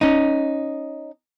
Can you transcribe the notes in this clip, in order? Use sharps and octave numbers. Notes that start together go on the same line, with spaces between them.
C#4 D#4